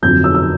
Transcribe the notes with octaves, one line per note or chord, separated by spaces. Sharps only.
F2 D3 F#3 G6
E6
E6